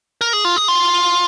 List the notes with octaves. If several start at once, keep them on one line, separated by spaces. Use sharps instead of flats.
A#4
G#4
F4
G#4
F4